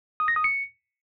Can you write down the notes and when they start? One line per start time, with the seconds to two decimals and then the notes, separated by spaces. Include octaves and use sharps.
0.20 D#6
0.28 A#6
0.36 D#6
0.44 C#7